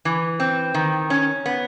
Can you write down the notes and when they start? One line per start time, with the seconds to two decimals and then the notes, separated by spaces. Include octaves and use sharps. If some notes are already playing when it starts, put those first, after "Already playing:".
0.05 E3
0.40 C4
0.74 D#3
1.10 C#4
1.46 B3